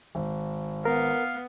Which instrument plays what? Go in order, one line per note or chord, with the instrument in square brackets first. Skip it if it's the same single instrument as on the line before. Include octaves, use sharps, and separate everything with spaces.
[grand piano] G#1
[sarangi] B3 [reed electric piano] A#4 [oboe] F5